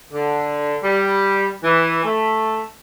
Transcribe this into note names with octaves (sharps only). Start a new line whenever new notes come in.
D3
G3
E3
A3